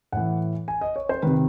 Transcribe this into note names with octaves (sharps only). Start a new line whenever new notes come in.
A2 E3 F#5
G#5
D#5
C#5
C5
C3 D#3 B4